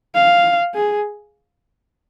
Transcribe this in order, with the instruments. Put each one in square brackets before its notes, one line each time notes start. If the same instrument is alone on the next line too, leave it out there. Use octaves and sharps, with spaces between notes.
[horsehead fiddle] F5
G#4